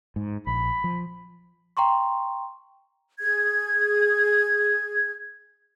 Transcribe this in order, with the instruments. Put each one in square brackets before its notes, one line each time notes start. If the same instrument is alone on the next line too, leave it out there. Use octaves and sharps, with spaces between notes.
[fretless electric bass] G#2
[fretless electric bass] A#1 [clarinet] B5
[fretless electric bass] F3
[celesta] G5 A#5 C6 C#6
[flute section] G#4 G#6